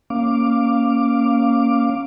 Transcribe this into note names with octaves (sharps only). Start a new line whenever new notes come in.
A#3 C#4 F5 D6